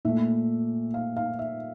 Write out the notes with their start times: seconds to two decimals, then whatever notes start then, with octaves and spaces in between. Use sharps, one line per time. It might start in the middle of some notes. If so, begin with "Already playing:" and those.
0.05 A#2 A3 E5
0.94 F5
1.16 F5
1.39 E5